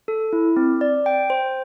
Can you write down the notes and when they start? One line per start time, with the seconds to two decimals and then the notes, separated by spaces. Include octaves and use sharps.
0.08 A4
0.33 E4
0.57 C4
0.81 D5
1.06 G5
1.30 C5